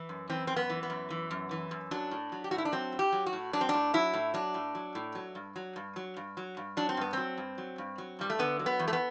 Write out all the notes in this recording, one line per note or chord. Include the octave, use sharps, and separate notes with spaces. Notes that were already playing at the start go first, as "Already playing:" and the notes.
Already playing: E3
F#2
E3 C4
F#2 C4
B3
E3
B3
F#2
E3
F#2
E3
F#2
F#3 D4
A2
F#3
G4
A2 F#4
E4
D4
F#3 C4
A2
G4
F#3
F#4
A2
F#3 D4
C4
A2 D4
F#3 E4
A2
F#3 D4
A2
F#3
A2
F#3
G2
F#3
G2
F#3
G2
F#3
G2
F#3 D4
C4
G2 B3
F#3 C4
G2
F#3
G2
F#3
G2 G3
A3
D3 B3
F#3
B3
E2
A3
B3